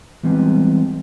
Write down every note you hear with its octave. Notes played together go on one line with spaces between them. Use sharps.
E3 G3 G#3 B3 C4